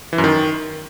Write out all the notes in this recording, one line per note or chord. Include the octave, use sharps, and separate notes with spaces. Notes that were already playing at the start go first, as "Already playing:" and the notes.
E3
F#2
D#3